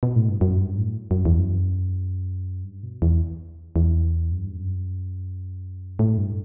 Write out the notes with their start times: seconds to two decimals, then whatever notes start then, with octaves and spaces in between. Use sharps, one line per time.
0.03 B2
0.16 A2
0.29 G2
0.41 F#2
0.60 G2
0.78 A2
1.11 F#2
1.25 E2
1.39 F#2
2.64 G2
2.83 B2
3.02 E2
3.76 E2
4.32 F#2
4.44 G2
4.56 F#2
5.99 A2
6.18 G2